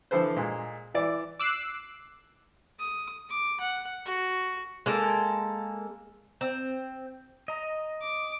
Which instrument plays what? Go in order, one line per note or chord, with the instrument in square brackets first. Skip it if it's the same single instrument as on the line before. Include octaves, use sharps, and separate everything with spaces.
[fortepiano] D3 E3 F3 A4 B4 C5
A#2 G#3
E3 D5
[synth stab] D6 E6 F#6 C7
[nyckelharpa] D#6
D6
F#5
F#4
[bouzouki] G#3 A#3 A4
C4
[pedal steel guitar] D#5 A#5
[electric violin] D6